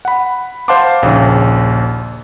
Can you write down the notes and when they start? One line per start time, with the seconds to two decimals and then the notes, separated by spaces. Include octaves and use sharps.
0.05 F#5 B5
0.68 C5 F5 F#5 A5 C6 D6
1.03 A#1 D#2 C#3